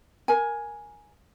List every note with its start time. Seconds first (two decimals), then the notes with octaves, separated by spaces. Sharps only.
0.28 A#4 G#5